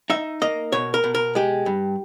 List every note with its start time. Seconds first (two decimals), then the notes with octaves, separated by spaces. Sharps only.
0.10 D#4 E5
0.42 A#3 D#5
0.72 B2 C#5
0.94 A#4
1.04 B2
1.15 A#4
1.35 G#3 G4
1.66 G2